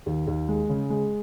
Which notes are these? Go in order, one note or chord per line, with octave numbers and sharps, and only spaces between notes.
D#2
D#2
G#3
C#3
G#3